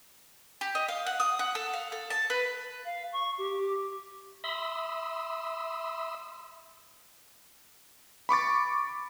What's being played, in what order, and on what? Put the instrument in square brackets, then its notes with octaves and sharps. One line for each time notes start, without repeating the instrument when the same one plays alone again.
[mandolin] G4
D#5
F5
F#5
D#6
F#5
A4
F5
A4
A5
B4
[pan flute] F5
C#6
G4
[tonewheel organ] E5 B5 C6 D#6 E6
[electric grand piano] B5 C#6 D6 A6